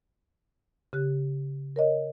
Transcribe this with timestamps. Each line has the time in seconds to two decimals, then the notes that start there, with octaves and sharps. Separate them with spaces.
0.93 C#3 G4 F#6
1.76 A#4 C#5 D#5